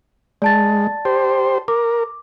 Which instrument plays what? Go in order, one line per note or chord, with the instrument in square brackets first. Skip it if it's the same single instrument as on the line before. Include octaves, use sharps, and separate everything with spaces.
[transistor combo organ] G#3 [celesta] D5 A5 A6
[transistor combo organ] G4 C5
[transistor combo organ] A#4 [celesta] D6